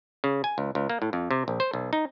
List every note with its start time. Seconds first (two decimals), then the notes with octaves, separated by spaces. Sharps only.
0.24 C#3
0.44 G#5
0.58 C#2
0.75 C#2
0.89 A#3
1.02 A2
1.13 F2
1.31 C3
1.48 A#1
1.60 C5
1.73 B1
1.93 D#4